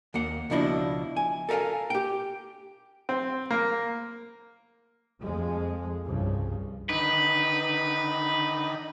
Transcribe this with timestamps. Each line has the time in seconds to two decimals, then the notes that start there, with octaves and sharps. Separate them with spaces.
0.14 D#2 A#3 F#5
0.50 C#2 B2 F3 D4 E4 D#5
1.17 G#5
1.49 A4 A#4 E5 F5 G#5
1.90 G4 G5
3.09 C4
3.50 A#3
5.20 F2 F3 G#3
6.05 C2 G2 C#3 F3
6.89 D3 D#3 D#4 B4